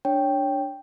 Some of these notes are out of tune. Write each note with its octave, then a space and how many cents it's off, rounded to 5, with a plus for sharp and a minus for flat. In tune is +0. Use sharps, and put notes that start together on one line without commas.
D4 +0 C#5 +0 G5 +0